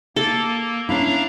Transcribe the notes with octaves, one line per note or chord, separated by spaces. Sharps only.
A#3 A4
C#4 D4 E4 F5 A#5